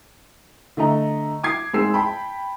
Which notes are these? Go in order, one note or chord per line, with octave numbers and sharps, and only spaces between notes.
D3 A3 D#5 A#5
D6 D#6 G#6 C7
G#2 C4 G#4 E6 C7
G5 A5 B5